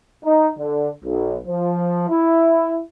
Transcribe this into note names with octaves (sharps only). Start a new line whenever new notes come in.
D#4
D3
B1
F3
E4